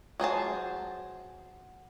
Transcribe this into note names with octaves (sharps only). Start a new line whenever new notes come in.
F#3 G#4 C5 A5